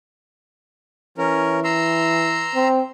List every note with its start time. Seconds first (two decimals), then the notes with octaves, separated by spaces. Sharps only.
1.18 E3 C#4 A#4
1.64 A#5 C6 E6
2.54 C4